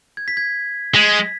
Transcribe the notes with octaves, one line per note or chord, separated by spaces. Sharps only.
G#6
B6
G#6
G#3 B6